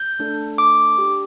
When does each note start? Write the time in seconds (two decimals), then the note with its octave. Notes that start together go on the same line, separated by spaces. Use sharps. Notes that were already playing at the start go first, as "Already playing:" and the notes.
Already playing: G6
0.19 A3 D4 A4
0.58 D6
0.97 D4 G4